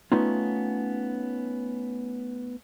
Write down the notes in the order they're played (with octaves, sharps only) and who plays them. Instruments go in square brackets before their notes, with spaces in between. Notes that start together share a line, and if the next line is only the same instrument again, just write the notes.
[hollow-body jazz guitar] A3 B3 C#4 D#4 F4